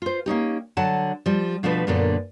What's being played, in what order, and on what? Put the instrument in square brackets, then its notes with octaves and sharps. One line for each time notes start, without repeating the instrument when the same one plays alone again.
[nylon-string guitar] F4 C5
A#3 C#4 D#4 G4
D3 F#3 F#5 A5
F3 G3
B2 F3 A3 D4 B4
F#2 A#2 D3 A#3 B3 D4